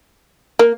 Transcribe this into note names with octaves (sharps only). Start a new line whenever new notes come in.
A#3